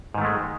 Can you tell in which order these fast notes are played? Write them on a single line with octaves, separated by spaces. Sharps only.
G#2 D#3 A3 G#3